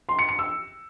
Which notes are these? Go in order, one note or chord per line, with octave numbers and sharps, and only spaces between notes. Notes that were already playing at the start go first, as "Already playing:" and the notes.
C6
C#7
C#7
E6